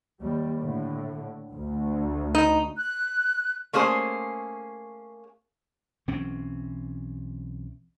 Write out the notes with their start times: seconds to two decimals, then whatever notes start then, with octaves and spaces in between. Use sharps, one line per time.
0.20 D#2 G3
0.62 A2 D3
1.52 D2
2.35 D#4
2.77 F#6
3.73 A3 A#3 C#4 G#4 C5
6.08 B1 E3 C4 C#4